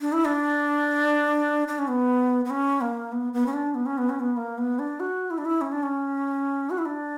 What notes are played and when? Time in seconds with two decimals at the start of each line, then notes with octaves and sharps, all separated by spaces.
0.01 D4
0.13 E4
0.25 D4
1.68 D4
1.78 C#4
1.88 B3
2.45 B3
2.50 C#4
2.81 A#3
3.12 B3
3.33 B3
3.46 C#4
3.53 D4
3.75 B3
3.86 C#4
3.98 B3
4.09 C#4
4.20 B3
4.37 A#3
4.58 B3
4.79 D4
5.00 F#4
5.30 E4
5.38 D4
5.45 E4
5.61 C#4
5.72 D4
5.83 C#4
6.70 F#4
6.78 E4
6.85 D4